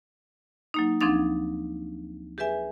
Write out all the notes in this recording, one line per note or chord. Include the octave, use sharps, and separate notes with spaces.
F#3 A#3 D#4
D2 F3 C4 D4 D#4 A6
G4 G#4 B4 E5 G#5